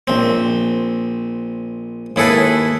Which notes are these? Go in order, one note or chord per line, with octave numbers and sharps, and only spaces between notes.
A#1 C4
D#2 E4 G#4 A4 B4